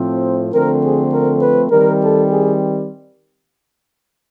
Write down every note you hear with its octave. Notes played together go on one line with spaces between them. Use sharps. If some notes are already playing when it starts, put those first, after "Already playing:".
Already playing: A2 F3 A3 C4
D3 F3 A3 C4 A#4
G#4
A#4
B4
D#3 G3 C4 A#4
A4
G#4